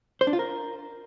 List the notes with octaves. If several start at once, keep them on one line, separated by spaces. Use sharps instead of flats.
C5
D4
F4
A#4